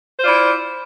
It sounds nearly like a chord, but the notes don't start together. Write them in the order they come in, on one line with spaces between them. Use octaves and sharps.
C5 F4 D5 E4